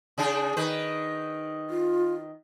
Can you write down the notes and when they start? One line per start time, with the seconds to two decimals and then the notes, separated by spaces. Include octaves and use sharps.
0.18 C#3 D4 G#4
0.57 D#3 B4
1.70 F4